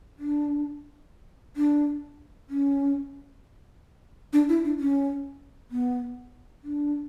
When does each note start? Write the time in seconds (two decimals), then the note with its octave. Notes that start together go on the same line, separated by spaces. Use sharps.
0.19 D4
1.56 D4
2.50 C#4
4.33 D4
4.49 E4
4.64 D4
4.80 C#4
5.71 B3
6.64 D4